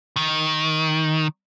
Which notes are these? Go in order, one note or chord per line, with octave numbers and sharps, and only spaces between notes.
D#3